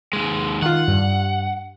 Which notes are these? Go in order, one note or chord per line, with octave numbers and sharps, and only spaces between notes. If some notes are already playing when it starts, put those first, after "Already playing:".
D#2 G#3
D#3 F4 F#5
G2